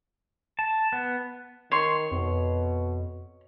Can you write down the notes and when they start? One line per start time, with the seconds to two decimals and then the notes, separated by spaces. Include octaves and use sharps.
0.59 A5
0.92 B3
1.72 D#3 C#5 C6
2.12 F2 B2